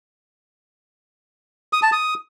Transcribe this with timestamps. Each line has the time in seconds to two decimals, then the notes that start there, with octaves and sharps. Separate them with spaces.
1.73 D#6
1.83 A5
1.92 D#6